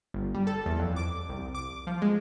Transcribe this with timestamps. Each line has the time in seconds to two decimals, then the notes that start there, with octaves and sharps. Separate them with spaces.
0.14 G1
0.35 G3
0.47 A4
0.66 E2
0.79 F2
0.96 D6
1.29 C2
1.55 D6
1.87 F3
2.02 G#3